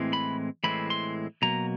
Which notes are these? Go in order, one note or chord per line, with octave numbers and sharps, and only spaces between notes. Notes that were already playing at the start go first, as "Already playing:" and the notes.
Already playing: A2 E3 G#3 C4
B5
A2 E3 G#3 C4 B5
C6
B2 F#3 A#3 A#5